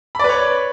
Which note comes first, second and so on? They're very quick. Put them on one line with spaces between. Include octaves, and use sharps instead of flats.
B5 D5 B4 C#5